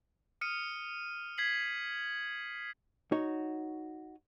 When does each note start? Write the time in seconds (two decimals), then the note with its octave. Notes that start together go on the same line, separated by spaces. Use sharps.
0.41 D#6 F6 C#7 D#7
1.38 G#6 B6 C7 F#7
3.12 D#4 F#4 C#5